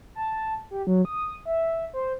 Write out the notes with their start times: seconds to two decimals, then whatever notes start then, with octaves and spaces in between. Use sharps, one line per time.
0.15 A5
0.71 G4
0.87 F#3
1.05 D#6
1.45 E5
1.94 C5